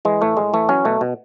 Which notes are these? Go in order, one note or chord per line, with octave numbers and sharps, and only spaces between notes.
E3 G#3
A2 A3
A2 G#3
E3 A3
F#3 C#4
B2 A3
B2